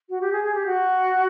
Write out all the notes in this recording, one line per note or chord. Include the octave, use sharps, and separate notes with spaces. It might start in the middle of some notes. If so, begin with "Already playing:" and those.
F#4
G4
G#4
G#4
G4
F#4